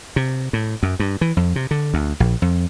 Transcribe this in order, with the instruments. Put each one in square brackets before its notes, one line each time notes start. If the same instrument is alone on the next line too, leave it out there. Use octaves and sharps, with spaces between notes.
[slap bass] C3
A2
F#2
G2
E3
F2
C3
D3
D2
A#1
F2